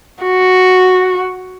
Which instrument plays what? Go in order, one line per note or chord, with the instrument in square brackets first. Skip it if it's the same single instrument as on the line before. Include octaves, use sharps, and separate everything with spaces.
[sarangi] F#4